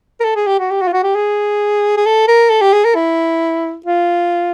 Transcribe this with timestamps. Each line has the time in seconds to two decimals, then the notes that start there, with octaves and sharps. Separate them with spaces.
0.20 A#4
0.24 A4
0.36 G#4
0.47 G4
0.59 F#4
0.71 G4
0.82 F#4
0.87 F4
0.93 F#4
1.03 G4
1.15 G#4
1.97 G#4
2.06 A4
2.28 A#4
2.50 A4
2.62 G4
2.73 G#4
2.85 A#4
2.95 E4
3.86 F4